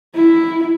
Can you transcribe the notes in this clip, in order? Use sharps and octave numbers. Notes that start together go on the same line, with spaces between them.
E4